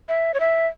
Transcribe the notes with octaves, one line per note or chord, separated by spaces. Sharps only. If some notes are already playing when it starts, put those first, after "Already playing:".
E5
C#5
E5